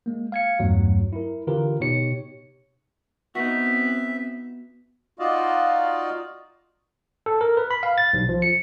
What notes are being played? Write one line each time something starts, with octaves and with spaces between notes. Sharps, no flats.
G#3 A#3
F5 G#6 C#7
E2 G2 F#3 A3
E4 A#4
D3 E3 F4 G4 A#4 B4
B2 D#4 G4 C#5 C#7
B3 C4 D#4 F#4 E5
D#4 F4 F#4 D5 D#5 F5
A4
A#4
B4
B5
F5
A6
B1
F3
C#7